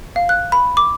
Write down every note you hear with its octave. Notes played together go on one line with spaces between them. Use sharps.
F5
F#6
B5
D6